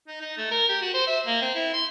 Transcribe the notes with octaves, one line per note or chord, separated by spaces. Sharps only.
D#4
D#4
A3
A#4
G4
F#4
C5
E5
A#3
C4
E4
C6